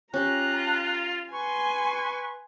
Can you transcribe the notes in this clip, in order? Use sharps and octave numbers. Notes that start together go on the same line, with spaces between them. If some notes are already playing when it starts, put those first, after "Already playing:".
C#4 F4 G4 A#5 F#6
B4 G#5 C6 C#6